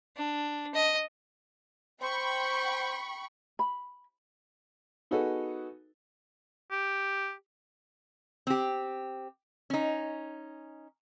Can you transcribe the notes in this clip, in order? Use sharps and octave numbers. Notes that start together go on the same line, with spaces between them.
D4
D#5
C5 G5 B5 C#6
B5
B3 D#4 F#4 G#4 A4 B4
G4
C4 G4
C#4 D#4